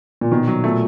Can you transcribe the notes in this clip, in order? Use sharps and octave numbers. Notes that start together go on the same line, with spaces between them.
A#2
B2 D#3
F#3
A#2 A3